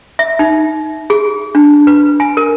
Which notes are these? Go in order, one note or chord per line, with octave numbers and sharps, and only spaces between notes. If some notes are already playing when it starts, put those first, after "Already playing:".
E5
D#4
G#4
D4
B4
G#5
A#4